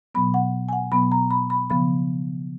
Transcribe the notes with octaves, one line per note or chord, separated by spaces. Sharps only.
B2 F#3 B3 B5
F#5
G#5
F#5
B2 F#3 B3 B5
A#5
B5
B5
C#3 F3 B3 B5